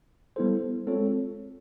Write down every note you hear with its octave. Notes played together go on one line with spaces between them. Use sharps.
G3 B3 E4 A4 C5
G#3 C4 F4 A4 C#5